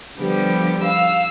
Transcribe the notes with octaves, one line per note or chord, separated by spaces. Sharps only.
D3 F3 G3 B3 G4
F5 E6